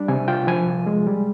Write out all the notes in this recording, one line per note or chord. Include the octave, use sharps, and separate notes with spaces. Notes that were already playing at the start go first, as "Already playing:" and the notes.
Already playing: G3 D4
C3 G#5
F4 G5
F3 G#5
C2
G#3
G3